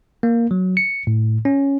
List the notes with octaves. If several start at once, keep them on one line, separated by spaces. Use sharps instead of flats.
A#3
F#3
C#7
A2
C#4